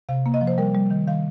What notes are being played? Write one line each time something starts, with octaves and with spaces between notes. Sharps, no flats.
C3 F5
A#3
D#5
F3
C5
G3 A#4
G3
D#3
D#3 F5